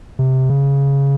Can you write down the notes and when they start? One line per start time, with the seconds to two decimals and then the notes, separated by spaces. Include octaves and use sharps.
0.19 C3
0.50 C#3